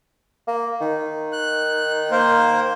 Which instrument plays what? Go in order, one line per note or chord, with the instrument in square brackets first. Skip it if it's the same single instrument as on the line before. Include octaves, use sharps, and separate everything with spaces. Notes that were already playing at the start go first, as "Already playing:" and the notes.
[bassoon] A#3
D#3
[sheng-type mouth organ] F#6
A#3 A#4 C5